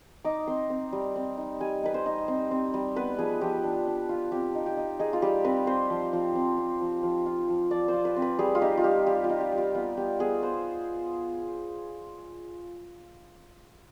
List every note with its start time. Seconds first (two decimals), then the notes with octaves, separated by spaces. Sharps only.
0.24 D#4 D6
0.47 C4 C6
0.70 C4
0.92 G3
1.16 C4
1.38 D#4
1.60 G3 G#5
1.83 D#4 B4
1.94 C5
2.06 D#4
2.28 C4
2.51 C4
2.74 G3
2.96 B3 B4
3.19 F3 G#4
3.41 F3 G4
3.64 D4
3.87 D4
4.09 F4
4.32 C4 G4
4.55 D#4
4.66 G4
4.77 D#4
4.99 D#4 G#4
5.13 F4
5.22 G3 G4
5.44 C4 B4
5.67 C4 C5
5.90 F3
6.13 F3
6.35 C4
6.58 C4
6.81 F3
7.03 F3
7.26 F4
7.48 F3
7.71 F3 D5
7.88 C5
7.94 F4
8.05 B4
8.16 C4
8.22 B4
8.39 G3 G#4
8.55 F4
8.61 D#4 G4
8.77 F4
8.84 G3 G4
9.06 G3 G4
9.24 F4
9.29 D#4
9.40 G4
9.52 G3
9.58 F4
9.75 B3 F4
9.97 B3 G4
10.19 B3 G#4
10.42 B3 C5